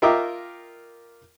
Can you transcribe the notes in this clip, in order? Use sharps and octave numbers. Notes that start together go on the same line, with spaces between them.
F4 A#4 D#5 E5 G5 D6